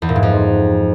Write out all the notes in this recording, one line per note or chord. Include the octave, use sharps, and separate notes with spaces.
E2
A#2
G#2
F2